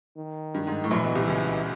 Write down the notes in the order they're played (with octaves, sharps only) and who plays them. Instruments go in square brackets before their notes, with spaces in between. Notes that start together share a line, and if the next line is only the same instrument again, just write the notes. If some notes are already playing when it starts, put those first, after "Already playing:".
[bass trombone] D#3
[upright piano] G2
G#2
A2
[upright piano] A#1 A#2 [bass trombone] E3
[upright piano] B1 B2
C2 C3
C#2 C#3